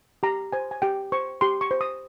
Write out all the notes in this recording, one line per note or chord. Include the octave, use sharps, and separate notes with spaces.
G4 A#5
C5 G#5
G#5
G4 G5
C5 C#6
G4 C6
C#6
C5
D#6